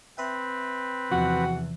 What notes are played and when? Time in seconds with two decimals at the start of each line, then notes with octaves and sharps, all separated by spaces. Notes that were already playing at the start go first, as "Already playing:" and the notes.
0.18 C4 B4 E5 G5
1.11 E2 C3 E3 F3 F#4 F#6